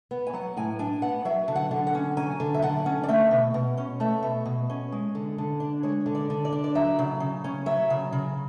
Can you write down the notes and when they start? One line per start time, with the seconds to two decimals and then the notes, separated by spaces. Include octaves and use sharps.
0.11 B3
0.27 G#5
0.33 F#3 F#5
0.57 A2 G#5
0.79 D4 G#5
1.02 B3 F#5
1.25 F#3 E5
1.48 D3
1.56 F#5
1.71 D3
1.87 F#5
1.95 C#4
2.17 F#3 G#5
2.40 D3
2.54 E5
2.62 D3 F#5
2.86 C#4
3.04 D5
3.09 A3 E5
3.31 B2
3.54 B2
3.78 C#4
4.00 A3 E5
4.23 B2
4.46 B2
4.70 C#4
4.92 G#3
5.15 D3
5.38 D3
5.60 D4
5.83 G#3 C#5
6.06 D3
6.15 D5
6.30 D3
6.45 D5
6.52 D4
6.64 D5
6.75 F#3 E5
6.99 C#3
7.20 C#3
7.44 C#4
7.66 F#3 E5
7.90 C#3
8.13 C#3